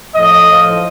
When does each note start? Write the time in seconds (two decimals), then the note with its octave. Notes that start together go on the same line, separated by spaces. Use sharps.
0.14 A2 F3 D#5
0.47 A2 F3